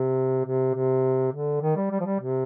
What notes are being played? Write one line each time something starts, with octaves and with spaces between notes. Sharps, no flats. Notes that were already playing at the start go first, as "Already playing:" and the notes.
Already playing: C3
C3
C3
D3
D#3
G3
G3
F3
G3
C3